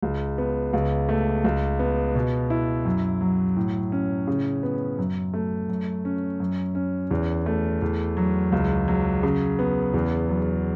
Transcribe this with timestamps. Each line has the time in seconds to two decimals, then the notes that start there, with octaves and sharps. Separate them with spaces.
0.03 C#2
0.38 B3
0.73 C#2
1.09 A3
1.44 C#2
1.79 B3
2.15 B2
2.50 E4
2.85 F#2
3.21 F#3
3.57 A2
3.92 C#4
4.27 C#3
4.63 B3
4.98 F#2
5.34 A3
5.69 F#2
6.05 C#4
6.40 F#2
6.75 C#4
7.11 E2
7.46 A3
7.82 E2
8.17 F#3
8.52 C#2
8.88 F#3
9.23 C#3
9.59 B3
9.94 E2
10.29 F#3